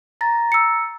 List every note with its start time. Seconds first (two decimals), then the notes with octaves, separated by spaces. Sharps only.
0.21 A#5 A6 A#6
0.52 E6 C#7